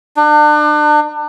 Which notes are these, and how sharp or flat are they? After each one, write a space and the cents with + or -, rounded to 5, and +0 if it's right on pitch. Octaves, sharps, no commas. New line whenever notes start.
D4 +35